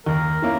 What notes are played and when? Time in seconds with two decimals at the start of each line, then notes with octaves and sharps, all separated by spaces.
0.06 D#2 A#4
0.42 D#3 A#3 C#4 E4